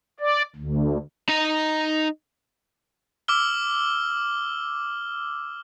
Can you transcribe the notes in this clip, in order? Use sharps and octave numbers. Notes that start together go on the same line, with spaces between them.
D5
D2
D#4 A#5
D6 E6 F6 G7